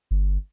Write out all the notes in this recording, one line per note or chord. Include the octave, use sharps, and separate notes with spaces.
G1